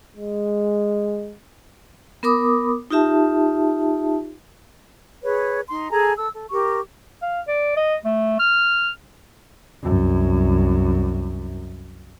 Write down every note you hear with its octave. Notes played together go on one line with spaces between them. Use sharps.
G#3
B3 A#4 B5 D6 D#6
D#4 F4 G4 E5 A5
G#4 B4 C#5
D#4 C6
G#4 A4 G#5 A#5
A4 E6
A4
G4 A#4 C#6
F5
D5
D#5
A3
F6
C2 F#2